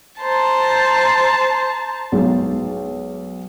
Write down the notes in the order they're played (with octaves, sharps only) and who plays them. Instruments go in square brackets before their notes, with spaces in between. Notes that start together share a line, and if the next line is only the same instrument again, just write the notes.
[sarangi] C5 [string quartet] A5 A#5
[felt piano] B1 G#3